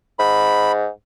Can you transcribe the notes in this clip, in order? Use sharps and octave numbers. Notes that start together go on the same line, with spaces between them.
G#2 B5